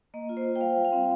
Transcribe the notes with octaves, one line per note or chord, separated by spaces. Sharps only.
A#3 D#5
F4
C5
F4
G5
G3 F5
G3
F5
C4